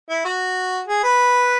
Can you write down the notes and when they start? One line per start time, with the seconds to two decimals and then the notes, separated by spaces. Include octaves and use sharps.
0.10 E4
0.25 F#4
0.88 G#4
1.04 B4